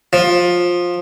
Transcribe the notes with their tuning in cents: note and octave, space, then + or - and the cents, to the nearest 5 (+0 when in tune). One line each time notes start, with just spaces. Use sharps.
F3 +15